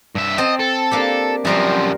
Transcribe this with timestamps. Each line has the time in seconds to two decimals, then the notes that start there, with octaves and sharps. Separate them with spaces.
0.15 G2 E5
0.38 C4 D#5 G5 A5
0.59 A4
0.91 A#3 D4 G4
1.45 F#2 F3 G3 A#4 C5